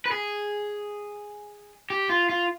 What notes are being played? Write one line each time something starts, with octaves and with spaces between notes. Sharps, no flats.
B4
G#4
G4
F4
F4